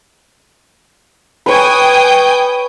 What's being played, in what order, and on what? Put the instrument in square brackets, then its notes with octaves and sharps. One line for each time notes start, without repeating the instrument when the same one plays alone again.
[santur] B4 C#5 [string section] G5 G#5 D#6